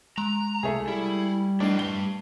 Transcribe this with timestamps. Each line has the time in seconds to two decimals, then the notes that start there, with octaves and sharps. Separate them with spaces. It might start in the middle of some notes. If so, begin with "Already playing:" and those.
0.18 G#3 A#5
0.63 C2 A3 G#4
0.88 G3 E4
1.60 A3 D4 E4 A#4 D#5 C7
1.79 G3 B4 G7